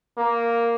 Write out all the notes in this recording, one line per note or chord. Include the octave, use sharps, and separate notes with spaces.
A#3